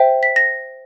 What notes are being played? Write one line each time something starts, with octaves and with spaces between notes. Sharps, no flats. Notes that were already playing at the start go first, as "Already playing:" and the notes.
Already playing: C5 E5 G5
B6
A#6